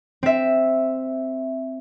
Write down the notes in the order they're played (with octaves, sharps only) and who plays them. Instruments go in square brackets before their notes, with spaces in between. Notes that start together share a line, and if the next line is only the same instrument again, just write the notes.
[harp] C4 E5